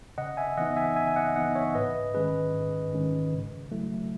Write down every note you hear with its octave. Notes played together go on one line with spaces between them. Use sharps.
C#3 D#5 F#5
E5 G#5
E3 B3 D#4 D#5 F#5
E5 G#5
C#3 E5 G#5
G#5
D#5 F#5
E3 B3 D#4 D#5 F#5
C#5 E5
G#2 B4 D#5
D#3 G#3 C#4 G#4 B4
G#2
D#3 G#3 C#4
C#3
F#3 A3 E4